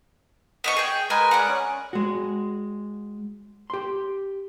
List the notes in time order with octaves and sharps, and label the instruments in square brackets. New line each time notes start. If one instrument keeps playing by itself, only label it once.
[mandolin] B3 D#5 C#6
G#4 G5
[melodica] G#3 A#4 B4 [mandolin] D#5 G#5
[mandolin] D5 F#5
[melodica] C#4
[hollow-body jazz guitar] G#3 F#4
G4 C6